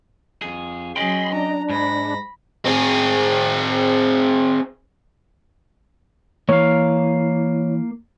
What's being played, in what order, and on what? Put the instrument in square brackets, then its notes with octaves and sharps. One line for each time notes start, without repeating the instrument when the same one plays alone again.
[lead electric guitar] F2 G#4
[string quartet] F#3 C#4 G#4 [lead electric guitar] D#5 G5 [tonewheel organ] B5 C6
[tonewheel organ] D4 [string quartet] A#5
[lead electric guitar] G#2 [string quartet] B5 A#6
[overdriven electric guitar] C4 G#4
[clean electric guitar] E3 [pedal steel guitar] A#3 F5 [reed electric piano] C#5